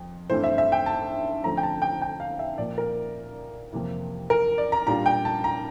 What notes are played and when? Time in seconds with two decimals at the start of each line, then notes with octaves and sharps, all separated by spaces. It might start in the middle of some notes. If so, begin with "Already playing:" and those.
Already playing: F2
0.30 G2 E3 A3 C4 E4 C5
0.44 E5
0.58 E5
0.72 G5
0.86 A5
1.44 D3 F3 A3 C4 A#5
1.57 G5
1.63 A5
1.82 G5
2.02 G5
2.20 F5
2.39 E5
2.58 A#2 F3 A#3 D5
2.78 A#4
3.72 F2 C3 E3 A#3 E4
4.30 A#4
4.58 D5
4.72 A#5
4.87 A#2 G3 D4 F4 A#5
5.06 G5
5.25 A5
5.44 A#5